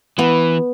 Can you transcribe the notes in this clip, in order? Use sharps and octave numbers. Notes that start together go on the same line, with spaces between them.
E3 B3